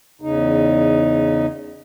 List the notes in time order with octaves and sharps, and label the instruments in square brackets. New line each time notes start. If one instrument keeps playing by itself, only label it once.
[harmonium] E2 C#3 D#4